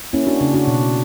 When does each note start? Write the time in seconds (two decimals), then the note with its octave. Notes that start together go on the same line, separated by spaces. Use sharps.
0.13 A#3 C#4 E4
0.26 D4 F#4
0.40 C#3 D4
0.54 D4 F#4
0.67 B2